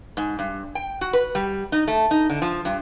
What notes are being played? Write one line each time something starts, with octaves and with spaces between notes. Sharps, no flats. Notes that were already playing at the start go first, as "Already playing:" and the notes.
G#2
G2
G5
F#4
B4
G3
D#4
A3
D#4
D3
F3
G2